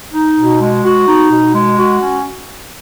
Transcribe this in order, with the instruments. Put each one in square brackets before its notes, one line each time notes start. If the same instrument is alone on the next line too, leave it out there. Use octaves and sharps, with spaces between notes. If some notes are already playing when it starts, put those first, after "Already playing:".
[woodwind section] D#4
B2
G#3
F#4
D#4
B2
G#3
F#4
C#4